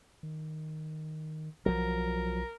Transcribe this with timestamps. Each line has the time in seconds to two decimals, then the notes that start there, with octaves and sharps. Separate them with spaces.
0.23 D#3
1.66 B1 F3 F#3 A#4